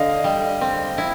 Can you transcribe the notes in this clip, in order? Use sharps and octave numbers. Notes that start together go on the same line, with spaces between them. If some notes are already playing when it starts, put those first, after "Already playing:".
Already playing: D3 D#5 F5
G3
C4
E4